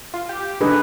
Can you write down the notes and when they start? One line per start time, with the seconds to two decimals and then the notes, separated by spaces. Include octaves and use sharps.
0.14 F4
0.29 G4
0.61 D3 G#3 D#4 B4